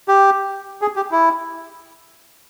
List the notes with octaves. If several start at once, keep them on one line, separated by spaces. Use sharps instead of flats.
G4
G#4
G4
E4